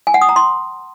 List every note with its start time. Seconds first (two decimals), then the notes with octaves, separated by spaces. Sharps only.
0.07 G#5
0.14 F#5
0.21 D#6
0.29 A#5
0.36 C6